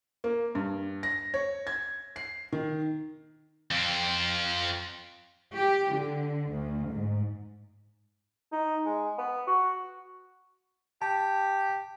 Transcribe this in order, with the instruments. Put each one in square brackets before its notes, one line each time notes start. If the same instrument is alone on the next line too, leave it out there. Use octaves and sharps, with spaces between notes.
[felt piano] A#3
G2
A#6
C#5
G#6
C7
D#3
[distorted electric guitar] F2 C4
[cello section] G4
D3
D2
G#2
[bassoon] D#4
G#3
B3
F#4
[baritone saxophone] G4 [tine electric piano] A5